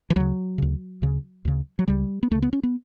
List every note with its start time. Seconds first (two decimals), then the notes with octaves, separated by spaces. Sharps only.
0.10 E3
0.16 D2 C#3 F#3
0.58 D2 C#3
1.02 D2 C#3
1.45 D2 C#3
1.79 F#3
1.88 C#2 C#3 G3
2.23 B3
2.31 C#2 C#3 A3
2.42 B3
2.53 C#4
2.63 B3